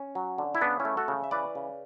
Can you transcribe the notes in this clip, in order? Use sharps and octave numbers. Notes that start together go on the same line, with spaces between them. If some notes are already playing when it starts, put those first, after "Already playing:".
Already playing: C#4
F#3
D3
E4
C#3 B3 D4
C#4 E4
A3
F#4 A4
C#3
E5
E3 B4 D5
C#3